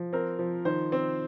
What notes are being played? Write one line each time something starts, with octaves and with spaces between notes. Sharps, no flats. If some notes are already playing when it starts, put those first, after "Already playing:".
Already playing: F3
C4 A#4
F3
D#3 C5
C4